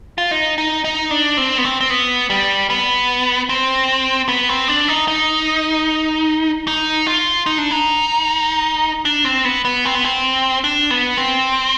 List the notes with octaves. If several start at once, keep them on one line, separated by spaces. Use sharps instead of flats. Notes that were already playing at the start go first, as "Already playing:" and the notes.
F4
D#4
D#4
D#4
D4
C4
B3
C4
C4
B3
G3
B3
C4
B3
C4
D4
D#4
D#4
D#4
F4
D#4
D4
D#4
D4
C4
B3
B3
C4
B3
C4
D4
B3
C4